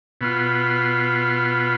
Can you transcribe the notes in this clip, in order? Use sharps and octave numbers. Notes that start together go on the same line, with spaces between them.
B2 B3 F4